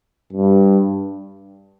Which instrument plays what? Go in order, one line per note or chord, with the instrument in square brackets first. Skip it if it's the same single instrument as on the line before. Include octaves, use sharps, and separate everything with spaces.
[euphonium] G2